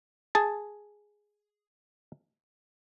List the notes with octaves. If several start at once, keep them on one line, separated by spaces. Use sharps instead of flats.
G#4 A5